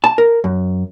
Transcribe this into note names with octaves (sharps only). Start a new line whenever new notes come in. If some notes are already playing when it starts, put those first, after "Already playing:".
A5
A#4
F#2